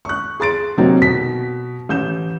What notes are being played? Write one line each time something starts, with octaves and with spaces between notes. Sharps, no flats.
C#6 F#6
G#4 C6 A6 D7
C3 F#3 A#3 C4 D#4 F#4
B2 B6
A1 G6 E7